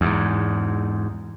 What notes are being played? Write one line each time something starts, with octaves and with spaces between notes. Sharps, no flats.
E2 G#2